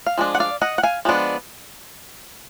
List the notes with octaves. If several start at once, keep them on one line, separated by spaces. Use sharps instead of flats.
F5
F3 G#3 D4
F#5
D5 F5
D#5 F#5
F#5
F5 G#5
F3 G#3 B3 D4